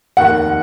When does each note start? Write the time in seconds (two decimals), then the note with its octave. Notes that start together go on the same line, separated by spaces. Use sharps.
0.17 F1 D#2 D#3 F#5